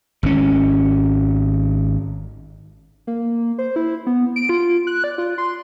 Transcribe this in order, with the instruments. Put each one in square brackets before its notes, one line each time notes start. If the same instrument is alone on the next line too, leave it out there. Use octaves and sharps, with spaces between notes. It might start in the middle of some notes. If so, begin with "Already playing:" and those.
[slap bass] G#1 B2 C#4
[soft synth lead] A#3
C5
E4
B3
D7
F4
F#6
D5
F4
C6